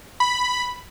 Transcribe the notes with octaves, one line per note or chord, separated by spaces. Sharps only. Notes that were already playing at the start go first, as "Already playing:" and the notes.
B5